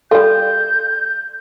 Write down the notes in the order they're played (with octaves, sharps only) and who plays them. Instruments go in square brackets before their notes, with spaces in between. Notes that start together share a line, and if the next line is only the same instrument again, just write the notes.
[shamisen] G3 F4 [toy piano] A4 [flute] G6